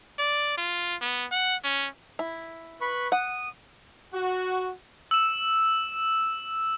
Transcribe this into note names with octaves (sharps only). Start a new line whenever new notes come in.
D5
F4
B3
F#5
C#4
E4
B4 B5 C#6
F#5 D#6
F#4
E6 E7